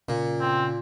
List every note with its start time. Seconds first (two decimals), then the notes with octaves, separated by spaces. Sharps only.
0.09 A#2 C#3
0.41 C4